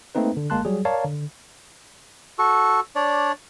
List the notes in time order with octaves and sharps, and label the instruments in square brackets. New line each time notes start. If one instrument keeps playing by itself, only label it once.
[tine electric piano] A3 A#3 C4 D#4 B4
D3
G1 G#3 A#3 A5 C6 F#6
F#3 G3 G#4
A#4 C#5 D5 F5 A5 A#5
D3
[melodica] F#4 A4 C#6
D4 C#5 D5